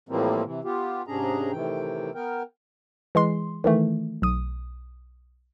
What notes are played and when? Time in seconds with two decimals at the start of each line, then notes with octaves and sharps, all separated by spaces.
0.09 A2 E3 F3 G3 A#3 C4
0.44 C3 E3
0.64 B3 F4 G4
1.07 G#2 C3 C#4 D4 G#4 A#5
1.52 A2 C3 D#3 E3 G5
2.15 B3 A#4 G5
3.15 E3 G#3 C6
3.64 D#3 E3 A3
4.22 B1 D#6